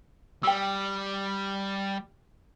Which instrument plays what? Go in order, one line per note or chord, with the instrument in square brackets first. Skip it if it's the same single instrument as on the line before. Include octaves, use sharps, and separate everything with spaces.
[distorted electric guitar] G3 [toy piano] G5 E6